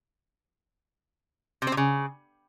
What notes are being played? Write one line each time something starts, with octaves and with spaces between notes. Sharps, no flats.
C3
C4
C3
C#3